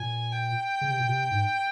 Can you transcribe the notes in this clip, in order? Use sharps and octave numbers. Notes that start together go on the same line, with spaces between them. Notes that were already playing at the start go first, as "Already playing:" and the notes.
Already playing: A#2 G#5
G5
C#3
C3
A#2
C3
G#2